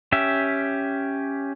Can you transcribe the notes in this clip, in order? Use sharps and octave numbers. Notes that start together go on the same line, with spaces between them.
C#4 G4 E5